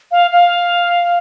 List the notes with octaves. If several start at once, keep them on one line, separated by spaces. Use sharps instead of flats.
F5
F5